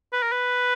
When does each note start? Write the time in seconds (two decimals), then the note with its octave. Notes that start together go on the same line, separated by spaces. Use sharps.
0.13 B4
0.22 A#4
0.32 B4